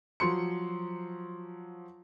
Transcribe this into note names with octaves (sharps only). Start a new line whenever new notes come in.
F3 F#3 C6 C#7